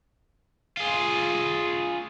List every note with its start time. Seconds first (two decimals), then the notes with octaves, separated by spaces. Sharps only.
0.77 F4 G#4